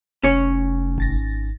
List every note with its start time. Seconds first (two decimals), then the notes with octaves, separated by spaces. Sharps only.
0.23 F1 C#4 C#5
0.98 G#1 A6 A#6